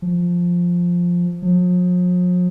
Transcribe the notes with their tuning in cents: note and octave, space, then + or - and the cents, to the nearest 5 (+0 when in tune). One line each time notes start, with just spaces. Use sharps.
F3 +5
F3 +45